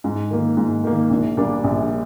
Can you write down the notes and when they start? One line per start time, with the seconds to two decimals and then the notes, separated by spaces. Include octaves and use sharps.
0.04 G#2
0.31 D#3 A#3
0.57 G#2
0.84 D#3 A#3
1.10 A#1
1.37 A#2 G3 A#3 D4
1.64 A#1